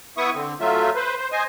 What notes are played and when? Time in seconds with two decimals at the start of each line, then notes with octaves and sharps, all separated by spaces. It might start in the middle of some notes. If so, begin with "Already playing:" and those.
0.17 B3 E4 E5 C#6 D#6
0.35 D3 C4
0.61 F#3 A3 F4 E5
0.95 B4 C5
1.17 C5
1.32 C5 D#5 G#5